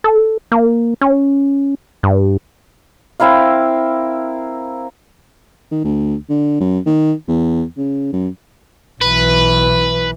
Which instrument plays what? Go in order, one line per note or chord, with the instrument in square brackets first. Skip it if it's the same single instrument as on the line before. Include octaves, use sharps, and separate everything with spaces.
[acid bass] A4
A#3
C#4
G2
[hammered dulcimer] C4 E4 A#4 F5
[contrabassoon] D#3
D2
D3
F#2
D#3
E2
C#3
F#2
[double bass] B1 E3 [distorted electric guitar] B4